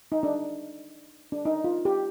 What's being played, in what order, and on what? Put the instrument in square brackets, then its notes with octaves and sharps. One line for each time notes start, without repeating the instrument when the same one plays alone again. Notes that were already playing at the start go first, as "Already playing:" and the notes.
[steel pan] D#4
D4
D4
D#4
F4
G4